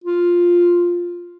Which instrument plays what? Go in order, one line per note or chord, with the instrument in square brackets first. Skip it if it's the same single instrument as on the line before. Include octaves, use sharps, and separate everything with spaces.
[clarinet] F4